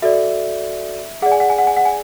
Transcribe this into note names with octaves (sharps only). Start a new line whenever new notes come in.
F#4 A4 D5 E5
G#4 D5 F#5
G#5
F#5
G#5
F#5
G#5
F#5
G#5